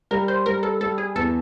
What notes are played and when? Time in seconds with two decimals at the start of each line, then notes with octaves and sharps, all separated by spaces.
0.11 G3 A#4
0.28 C5
0.46 G3 A#4
0.63 A4
0.81 G3 A4
0.98 G#4
1.15 E2 A4